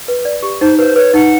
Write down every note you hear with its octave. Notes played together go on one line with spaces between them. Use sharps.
B4
D5
G4
D#4 C5
B4 C5
B4 C#5
D#4 F#5